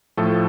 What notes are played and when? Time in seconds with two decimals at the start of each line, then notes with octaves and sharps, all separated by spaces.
0.17 A2 F3 A3 A4